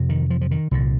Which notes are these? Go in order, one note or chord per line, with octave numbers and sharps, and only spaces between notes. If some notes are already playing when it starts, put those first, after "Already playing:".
Already playing: F2 C3
D#3
F3
F3
D#3
C2 A#2 D3